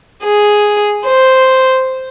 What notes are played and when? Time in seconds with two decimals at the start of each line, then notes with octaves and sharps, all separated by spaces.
0.23 G#4
1.06 C5